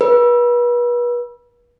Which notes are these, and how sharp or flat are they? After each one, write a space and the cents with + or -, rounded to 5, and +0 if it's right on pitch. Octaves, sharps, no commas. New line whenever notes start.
B4 -35